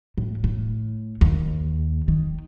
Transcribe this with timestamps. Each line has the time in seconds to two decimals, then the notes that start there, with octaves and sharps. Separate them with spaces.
0.18 A2
0.44 A2
1.21 D#2
2.08 D#3